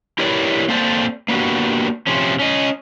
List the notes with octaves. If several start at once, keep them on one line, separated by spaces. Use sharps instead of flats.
E4 G4 A#4 B4 C#5 D5
A#3 C4 A4 C5 D5
A#3 B3 D4 F#4 G4
C3 F3 C#4
C#4 D#5